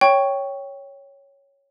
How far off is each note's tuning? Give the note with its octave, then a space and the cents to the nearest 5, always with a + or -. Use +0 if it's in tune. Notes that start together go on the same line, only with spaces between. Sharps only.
C#5 +0 G5 +0 C#6 +0